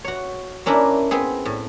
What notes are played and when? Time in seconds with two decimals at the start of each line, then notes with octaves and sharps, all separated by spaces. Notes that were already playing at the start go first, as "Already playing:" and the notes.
0.05 F#4 C#5
0.66 A#3 C#4 D4 E4 A#4
1.11 B3 C4 G#4
1.45 A2